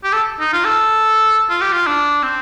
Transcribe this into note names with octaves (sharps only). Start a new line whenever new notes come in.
G4
A4
D#4
F4
A4
F4
G4
F4
D4
C4